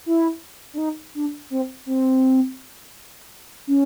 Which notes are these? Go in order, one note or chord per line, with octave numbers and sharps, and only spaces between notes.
E4
D4
D#4
D4
C4
C4
C#4